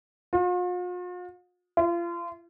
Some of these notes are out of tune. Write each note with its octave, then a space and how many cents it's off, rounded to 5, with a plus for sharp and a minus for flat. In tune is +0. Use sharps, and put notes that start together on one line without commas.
F4 +45
F4 -30